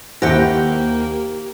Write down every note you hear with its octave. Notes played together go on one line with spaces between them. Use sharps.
D#2 A#3 E4 G4 C5 F#5 G5 A#6